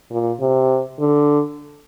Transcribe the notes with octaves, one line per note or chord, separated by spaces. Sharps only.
A#2
C3
D3